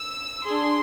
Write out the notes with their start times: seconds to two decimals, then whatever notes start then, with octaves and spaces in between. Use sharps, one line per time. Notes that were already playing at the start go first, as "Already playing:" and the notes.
Already playing: E6
0.46 D4 G#4 C6